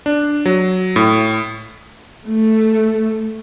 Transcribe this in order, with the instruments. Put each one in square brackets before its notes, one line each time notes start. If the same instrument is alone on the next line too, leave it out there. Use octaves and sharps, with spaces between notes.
[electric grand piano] D4
F#3
A2
[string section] A3